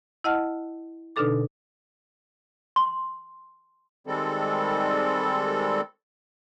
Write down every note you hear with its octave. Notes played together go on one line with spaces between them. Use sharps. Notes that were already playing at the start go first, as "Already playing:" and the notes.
E4 D#5 F#5 A5 F6
B2 D3 D4 D#4 A4 D6
C6
D#3 G3 G#3 C4 A4